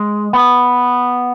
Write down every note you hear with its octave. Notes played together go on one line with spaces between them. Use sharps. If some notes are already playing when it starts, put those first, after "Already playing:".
Already playing: G#3
B3